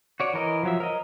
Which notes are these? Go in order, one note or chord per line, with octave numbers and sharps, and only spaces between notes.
F#4 C#5 D5
E3 A#4 D#5
F3 F#3 E5
A#4 D#5